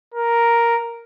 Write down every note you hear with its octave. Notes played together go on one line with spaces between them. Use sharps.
A#4